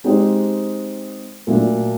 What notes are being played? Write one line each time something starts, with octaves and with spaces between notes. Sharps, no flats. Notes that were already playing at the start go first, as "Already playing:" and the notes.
G#3 C4 D#4 G4 C5
A#2 F#3 A3 D4 F4